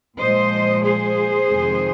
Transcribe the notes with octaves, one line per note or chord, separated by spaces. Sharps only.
A#2 F3 G#3 C5 D#5
G#4 C5
F2 C3 D#3 G#3